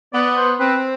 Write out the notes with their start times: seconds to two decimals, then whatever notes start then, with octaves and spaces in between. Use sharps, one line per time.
0.13 B3 D5
0.37 C5
0.59 C4 B4